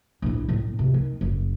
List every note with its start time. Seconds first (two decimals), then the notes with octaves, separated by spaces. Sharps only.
0.22 A#1 E4
0.49 A2
0.79 C3 A3
0.94 D#3
1.21 F#1